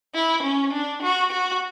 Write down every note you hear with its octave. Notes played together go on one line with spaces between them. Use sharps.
E4
C#4
D4
F#4
F#4